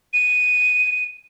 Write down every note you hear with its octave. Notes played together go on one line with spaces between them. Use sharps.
D#7